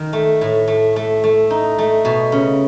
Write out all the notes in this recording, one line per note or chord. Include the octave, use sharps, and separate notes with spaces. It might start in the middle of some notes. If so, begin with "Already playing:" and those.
Already playing: D#3
A3
A2
A3
A3
A3
D#4
A3
B2
C#3